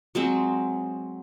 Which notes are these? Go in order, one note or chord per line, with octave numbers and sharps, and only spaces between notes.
F#3 G#3 C4